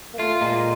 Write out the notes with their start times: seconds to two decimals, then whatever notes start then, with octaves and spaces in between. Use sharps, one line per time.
0.13 A#3
0.19 A3 F4
0.41 A#2 G#3